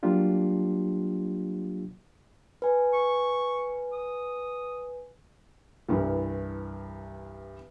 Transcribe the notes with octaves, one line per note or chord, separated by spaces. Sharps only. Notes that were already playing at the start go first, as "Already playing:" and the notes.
F#3 G3 A#3 D4 F4 G4
B4 G#5
C#6
D#6
C2 G2 E3